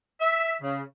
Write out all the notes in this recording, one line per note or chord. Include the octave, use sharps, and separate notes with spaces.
E5
C#3